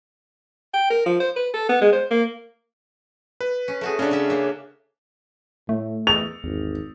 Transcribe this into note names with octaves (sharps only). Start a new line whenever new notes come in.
G5
A#4
F3
C5
B4
A4
B3
G#3
C5
A#3
B4
C#4
A3 F#4 G#4
C#3 C#4 D4
C#3 E5
A#3 E5
A2 A3
E2 F7
G#1 E2